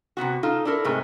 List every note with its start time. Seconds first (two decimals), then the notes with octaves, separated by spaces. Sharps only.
0.17 C3 D#3 B3 F#4
0.43 D#4 F4 A4
0.65 D4 E4 A4 A#4
0.84 G#2 C3 G#3 A3